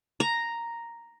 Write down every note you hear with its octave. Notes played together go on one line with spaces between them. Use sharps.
A#5